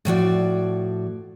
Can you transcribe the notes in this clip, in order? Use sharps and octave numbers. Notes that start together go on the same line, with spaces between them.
A2 F3 F#4 D5